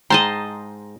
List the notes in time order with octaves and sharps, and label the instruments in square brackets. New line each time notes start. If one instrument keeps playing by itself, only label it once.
[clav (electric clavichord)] G#2 G5 A#5 [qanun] D#5 A5 C6